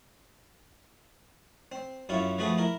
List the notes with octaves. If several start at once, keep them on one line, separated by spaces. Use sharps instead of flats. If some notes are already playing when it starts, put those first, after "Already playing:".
C4
F#2 E4 F4 C#5
F3 A3 F#4 G#4 B4
E4 A#4